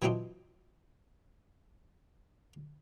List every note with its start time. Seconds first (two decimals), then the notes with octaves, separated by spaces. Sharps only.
0.02 E3 F#3 C4 D4 D#4 F4